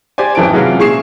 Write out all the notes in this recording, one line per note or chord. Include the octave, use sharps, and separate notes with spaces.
G4 C5 D5 G#5
G#1 F2 E3 C#4 A5 D7
C3 E3 F#3 G#3 C#4 F4
A#2 E4 G#4 C#6 C7 E7